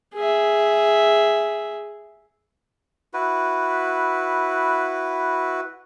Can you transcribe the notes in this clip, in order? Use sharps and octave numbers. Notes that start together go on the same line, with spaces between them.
G#4 E5
E4 F#4 B4